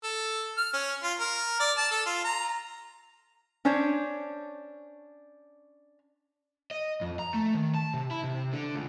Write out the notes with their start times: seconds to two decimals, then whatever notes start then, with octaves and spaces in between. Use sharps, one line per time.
0.04 A4
0.57 F6
0.73 C#4
1.03 F4
1.19 A#4
1.60 D5
1.77 A5
1.91 A4
2.06 F4
2.24 A#5
3.65 C#4 D4 C5 C#5
6.71 D#5
7.01 F2
7.19 A#5
7.34 A3
7.54 D#3
7.75 A5
7.94 C3
8.11 E4
8.24 C3
8.53 D3
8.75 C#2